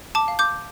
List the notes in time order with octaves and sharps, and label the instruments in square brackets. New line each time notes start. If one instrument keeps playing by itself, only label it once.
[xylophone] A5 D6
F5
D6 G6